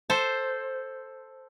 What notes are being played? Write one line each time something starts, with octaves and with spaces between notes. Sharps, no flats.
A4 C5